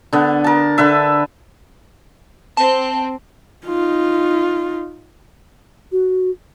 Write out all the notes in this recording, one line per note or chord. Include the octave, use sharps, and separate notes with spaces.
D3 B3
A#4 A5
D3 B4 E5
C4 A5
D#4 F4
F#4